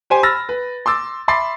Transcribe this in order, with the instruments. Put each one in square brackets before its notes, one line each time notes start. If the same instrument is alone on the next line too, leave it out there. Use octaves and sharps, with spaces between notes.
[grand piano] G4 C5 G#5
B5 E6 F6 A6 A#6
B4
C6 D6 E6 A6
E5 B5 C6 D6 A6 C7